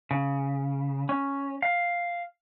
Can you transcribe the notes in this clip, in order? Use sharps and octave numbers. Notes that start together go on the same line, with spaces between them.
C#3
C#4
F5